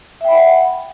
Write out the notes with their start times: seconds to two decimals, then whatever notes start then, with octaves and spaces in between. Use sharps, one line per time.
0.21 E5
0.25 G5
0.28 B5
0.32 F#5